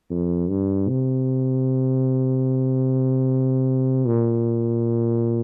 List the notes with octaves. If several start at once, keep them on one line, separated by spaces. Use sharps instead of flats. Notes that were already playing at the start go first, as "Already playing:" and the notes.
F2
G2
C3
A#2